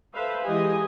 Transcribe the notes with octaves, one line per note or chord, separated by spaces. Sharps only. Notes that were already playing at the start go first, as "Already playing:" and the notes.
A4 B4 C5 E5 F5
E3 G#3 G4 D#5 G#5